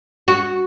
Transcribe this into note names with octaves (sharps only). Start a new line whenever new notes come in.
F#4